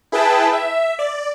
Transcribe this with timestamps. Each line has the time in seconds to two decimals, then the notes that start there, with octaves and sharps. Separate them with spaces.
0.12 E4 G#4 B4 G5 A5
0.53 E5
0.99 D5